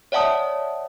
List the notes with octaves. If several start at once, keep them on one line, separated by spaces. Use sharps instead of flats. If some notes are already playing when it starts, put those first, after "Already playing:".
C#5 D5 E5 F#5 A5 D#6